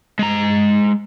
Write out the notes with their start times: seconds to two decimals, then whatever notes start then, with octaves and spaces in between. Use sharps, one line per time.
0.19 G#3 A#5